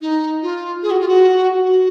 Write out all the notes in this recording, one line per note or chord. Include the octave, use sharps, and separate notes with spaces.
D#4
F4
G#4
F#4
F4
F#4
F#4